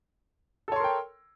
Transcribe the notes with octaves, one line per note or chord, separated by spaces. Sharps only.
A4 A#4 C#5 G5 C6